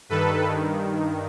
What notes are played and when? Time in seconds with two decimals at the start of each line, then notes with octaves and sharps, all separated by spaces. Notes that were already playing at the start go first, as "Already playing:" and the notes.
0.09 G2 D#3 A4 B4
0.44 G2 D#3